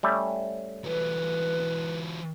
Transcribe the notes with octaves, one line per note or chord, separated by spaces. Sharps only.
G3 A3 C#4
E3 F#3 B4